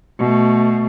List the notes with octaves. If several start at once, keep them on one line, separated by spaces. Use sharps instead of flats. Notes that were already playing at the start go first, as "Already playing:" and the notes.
B2 A3